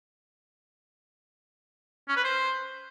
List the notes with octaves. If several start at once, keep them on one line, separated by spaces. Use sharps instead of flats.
C#4
B4
C5